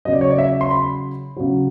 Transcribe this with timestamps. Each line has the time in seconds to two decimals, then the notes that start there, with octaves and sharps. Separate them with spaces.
0.05 C#3 F#3 D#5
0.13 D5
0.21 C#5
0.30 D5
0.38 E5
0.61 C6
0.71 B5
1.37 C#3 F#3